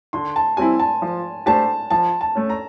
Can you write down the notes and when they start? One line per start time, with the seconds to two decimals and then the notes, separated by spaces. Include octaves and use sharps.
0.13 D3 C6
0.36 A5
0.57 G3 C4 E4 G#5
0.79 A5
1.02 F3
1.46 A3 D4 G4 C5 A5
1.90 F3 A5
2.21 A5
2.35 A3 C#4
2.50 A#5